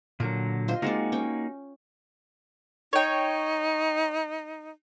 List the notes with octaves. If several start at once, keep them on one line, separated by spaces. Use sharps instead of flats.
A#2 D3 F#3 A#4
F4 C5 D#5
G#3 A#3 C4 D#4 F#4 D5
C#4 G5
D#4 C#5 G5